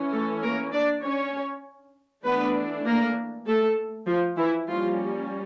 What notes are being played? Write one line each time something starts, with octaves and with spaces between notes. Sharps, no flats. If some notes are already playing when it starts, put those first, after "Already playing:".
Already playing: E3 C#4
A3 A4
A#3 A#4
D4 D5
C#4 C#5
E3 A3 B3 D4 B4
A#3 A#4
A3 A4
F3 F4
E3 E4
F3 G3 A#3 C#4 F4